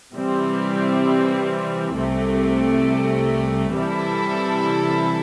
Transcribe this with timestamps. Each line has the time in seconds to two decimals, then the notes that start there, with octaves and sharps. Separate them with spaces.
0.14 C3 E3 G3 C4
1.95 C2 C3 A3
3.76 C3 E3 G3 E4 A4